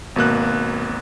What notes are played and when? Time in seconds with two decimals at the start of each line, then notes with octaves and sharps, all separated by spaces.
0.16 G#1 B2 A#3 F#6